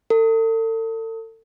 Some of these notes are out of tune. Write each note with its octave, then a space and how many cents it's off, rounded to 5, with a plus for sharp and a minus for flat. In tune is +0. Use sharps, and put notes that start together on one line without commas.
A4 +40